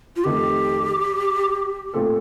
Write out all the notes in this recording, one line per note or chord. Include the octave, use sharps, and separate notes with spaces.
F4
F2 D#3 A3 G4
A#2 A3 C4 F4 A4